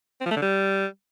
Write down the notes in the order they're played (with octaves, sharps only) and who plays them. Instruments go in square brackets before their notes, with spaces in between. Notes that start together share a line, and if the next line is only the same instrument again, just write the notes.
[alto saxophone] C4
F3
A3
D3
G3